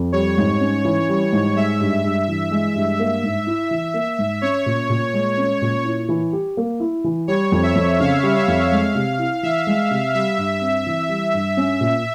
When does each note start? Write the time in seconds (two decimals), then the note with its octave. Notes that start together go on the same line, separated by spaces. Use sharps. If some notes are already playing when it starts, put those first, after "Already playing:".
Already playing: F2
0.12 G3 C#5
0.37 G#2
0.61 C#4
0.85 E3
1.09 G3
1.32 G#2
1.56 G#3 E5
1.80 G2
2.04 G2
2.28 E3
2.51 G#3
2.75 G2
2.99 A#3
3.23 G#2
3.47 E4
3.71 E3
3.94 A#3
4.18 G#2
4.42 C#4 C#5
4.66 A#2
4.90 A#2
5.14 G#3
5.38 C#4
5.62 A#2
5.85 E4
6.09 E3
6.33 G4
6.57 A#3
6.80 E4
7.04 E3
7.28 G3 C#5
7.52 F2
7.63 E5
7.75 F2
8.00 C#3 F5
8.23 G3
8.36 E5
8.48 F2
8.71 G#3 F5
8.95 C3
9.19 E4
9.43 E3 E5
9.67 G#3
9.91 C3
10.14 G3 E5
10.38 G2
10.61 C4
10.86 E3
11.09 G3
11.34 G2
11.57 C#4
11.81 A#2